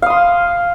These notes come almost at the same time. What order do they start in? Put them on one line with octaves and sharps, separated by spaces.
F5 D#6 C6